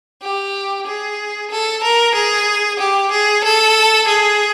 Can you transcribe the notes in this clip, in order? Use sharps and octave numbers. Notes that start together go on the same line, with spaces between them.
G4
G#4
A4
A#4
G#4
G4
G#4
A4
G#4